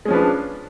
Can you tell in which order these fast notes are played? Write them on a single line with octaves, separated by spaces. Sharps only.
G#3 C#4 F3 B4 D4